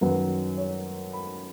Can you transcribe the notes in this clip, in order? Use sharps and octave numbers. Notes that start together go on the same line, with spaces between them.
F#2 D#3 F#3 B4
C#5
B5